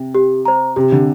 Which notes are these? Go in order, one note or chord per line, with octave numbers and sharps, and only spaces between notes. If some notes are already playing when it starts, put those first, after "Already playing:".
Already playing: C3
G4
C5 A#5
C3 G4
D3